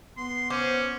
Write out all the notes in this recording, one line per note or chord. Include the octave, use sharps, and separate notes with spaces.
B3 C6
C#4 C5 D6